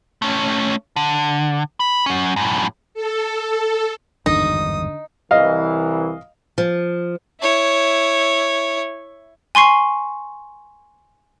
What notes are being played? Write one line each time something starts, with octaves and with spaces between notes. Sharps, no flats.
A3 C#4
D3
B5
F#3 C#4
F#2 A2
A4
G#1 E2 G2 D3 D#4 D#6
C2 E3 D#5 F5
F3
E4 C#5
G#5 C6 C#6 C7